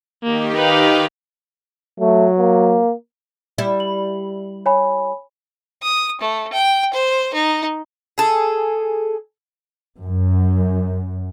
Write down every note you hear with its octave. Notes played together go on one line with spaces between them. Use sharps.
D#3 A#3 D#4 G4
B4 F5
F#3 A3
A#3
G3 E4
F#7
C#5 G#5 B5
D#6
A3
G5
C5
D#4
G#4 A4
F#2